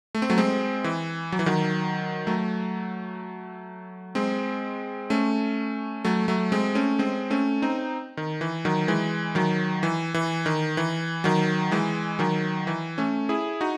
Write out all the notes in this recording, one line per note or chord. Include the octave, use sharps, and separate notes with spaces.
A3
C4
F#3 A3
G#3 C4
E3
F#3
E3
D#3 F#3
F#3 A3
G#3 C4
A3 C#4
F#3 A3
F#3 A3
G#3 C4
A3 C#4
G#3 C4
A3 C#4
C4 D#4
D#3
E3
D#3 F#3
E3 G#3
D#3 F#3
E3
E3
D#3
E3
D#3 F#3
E3 G#3
D#3 F#3
E3
A3 C#4
E4 G#4
D#4 F#4